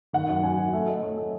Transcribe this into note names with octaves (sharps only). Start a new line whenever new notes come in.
D#3 F#5
F#2
F#2 G#5
F#2
A3 E5
A3 D#5
A3 C#5
A3 A4